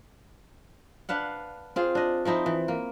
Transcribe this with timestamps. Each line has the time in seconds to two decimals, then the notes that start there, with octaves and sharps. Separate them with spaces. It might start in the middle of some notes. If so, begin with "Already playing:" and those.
1.09 D4 B4 F5 F#5
1.76 C4 F4 G#4
1.95 D4 D#5
2.25 F3 C4 D#4 E4
2.46 E3
2.68 A#3